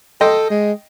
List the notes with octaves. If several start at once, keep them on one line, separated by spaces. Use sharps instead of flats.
A4 D#5 G5 C6
G#3